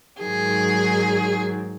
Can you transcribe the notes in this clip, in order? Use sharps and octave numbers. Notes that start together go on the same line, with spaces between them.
G#2 D#3 F#3 G#4